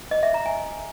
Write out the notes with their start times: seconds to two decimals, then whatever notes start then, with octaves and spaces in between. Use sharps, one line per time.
0.11 D#5
0.23 E5
0.34 A#5
0.46 G#5